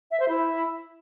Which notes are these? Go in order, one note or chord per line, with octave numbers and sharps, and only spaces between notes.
E5
C5
E4